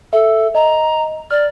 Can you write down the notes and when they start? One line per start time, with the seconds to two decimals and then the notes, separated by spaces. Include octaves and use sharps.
0.13 A4 E5
0.55 D#5 A#5
1.31 D5 F6